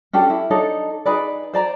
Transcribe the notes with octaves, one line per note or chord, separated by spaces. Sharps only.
C#4 D4 G4 A4
E4
D4 D#4 A4 C#5
D#4 G#4 B4 D5
C5 D5 A#5